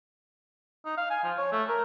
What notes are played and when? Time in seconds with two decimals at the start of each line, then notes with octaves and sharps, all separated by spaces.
0.85 D#4
0.97 F5
1.10 G#5
1.24 F3
1.38 C#5
1.52 A3
1.68 A#4